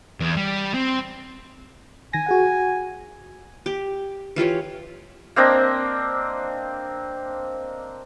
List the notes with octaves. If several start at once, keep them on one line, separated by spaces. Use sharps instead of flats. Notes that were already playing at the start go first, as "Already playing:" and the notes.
E2
G3
C4
D#3 G#5 A#6
F#4 G#4 F#5
G4
E3 F4 G4 C#5
A#3 C4 D4 D#5